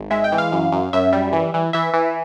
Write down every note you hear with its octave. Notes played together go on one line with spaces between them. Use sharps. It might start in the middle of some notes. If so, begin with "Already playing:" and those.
Already playing: G#1
G#3 E5
G5
E3
F5
F#2
F#2
F#2 E5
G3
E3
E3
E3 E5
E3